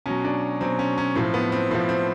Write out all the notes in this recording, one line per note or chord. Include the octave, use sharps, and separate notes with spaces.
B2 F#3 C#4
D4
B2 F#3 C4
C#4
C#4
A2 F3 C4
B3
C4
A2 F3 C4
C4